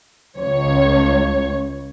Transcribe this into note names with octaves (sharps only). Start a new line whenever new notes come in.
C#2 C#5